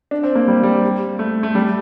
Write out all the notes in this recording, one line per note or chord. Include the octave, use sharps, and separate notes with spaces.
D4
C4
A#3
G3
G3
A3
A3
G3